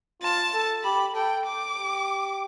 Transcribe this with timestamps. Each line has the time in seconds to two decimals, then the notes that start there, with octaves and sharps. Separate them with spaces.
0.22 F4 A5
0.54 A4
0.84 G4 B5
1.15 A4 G5
1.46 D6
1.77 G4